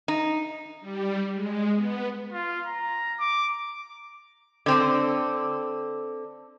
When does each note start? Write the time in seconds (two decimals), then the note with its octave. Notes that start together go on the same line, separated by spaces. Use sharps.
0.08 D#4
0.81 G3
1.34 G#3
1.74 B3
2.33 F4
2.66 A#5
3.20 D6
4.66 D3 C4